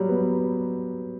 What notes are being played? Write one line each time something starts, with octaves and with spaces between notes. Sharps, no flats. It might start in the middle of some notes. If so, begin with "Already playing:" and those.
Already playing: F#3 G3
B3